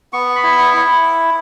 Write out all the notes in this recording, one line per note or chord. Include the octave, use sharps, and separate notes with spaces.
B3 C#6
B5
E4
E6
C#6
E4